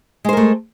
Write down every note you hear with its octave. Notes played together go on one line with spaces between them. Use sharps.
G#3 A3 A#4 C5